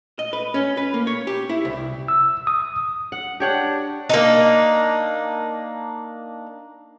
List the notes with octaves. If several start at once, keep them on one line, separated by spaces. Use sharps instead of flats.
D#5
B4
C#4
B4
A#3
C#5
G4
E4
C2
E6
D#6
F#5
D4 G4 C#5 F#5
A#3 D4 D#4